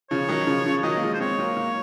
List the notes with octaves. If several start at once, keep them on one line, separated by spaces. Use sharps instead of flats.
C#3 F3 C#5
D#3 F#3
C#3 F3
C#3 F3
D#3 F#3 D#5
A#3
F3 G#3
C5
G#3 C4 C#5
F#3 A#3
F#3 A#3